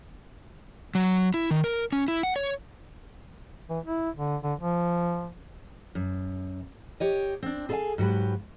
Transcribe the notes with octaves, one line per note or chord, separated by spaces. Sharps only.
F#3
E4
D#3
A#4
C#4
E4
F#5
C#5
E3
E4
D3
D3
F3
F#2
G4 C#5 D#5
C4 D4
G#4 A4 C5 E5 F5 G#5
G#2 F#3 G4 B4